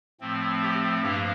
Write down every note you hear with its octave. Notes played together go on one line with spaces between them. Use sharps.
A2 F3 A3 C4
G4
G2 F3 A#3 D4 G4